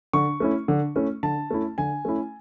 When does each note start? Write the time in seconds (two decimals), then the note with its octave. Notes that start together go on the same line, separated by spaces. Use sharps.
0.13 D3 C#6
0.40 A3 C#4 E4
0.68 D3
0.96 A3 C#4 E4
1.23 D3 A5
1.51 A3 C#4 E4
1.78 D3 G#5
2.05 A3 C#4 E4